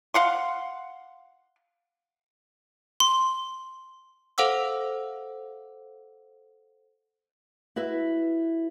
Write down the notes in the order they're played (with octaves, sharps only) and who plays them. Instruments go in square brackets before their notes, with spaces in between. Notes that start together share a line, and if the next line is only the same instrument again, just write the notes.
[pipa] F5 F#5 C6
[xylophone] C6
[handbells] A4 C5 F5 F#5 D6 E6
[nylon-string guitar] E4 F#4 B4 E5